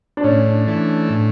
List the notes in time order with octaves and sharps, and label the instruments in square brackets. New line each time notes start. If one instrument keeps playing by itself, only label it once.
[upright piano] D4
[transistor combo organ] A2 [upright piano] C#4
[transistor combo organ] E3 A3
A2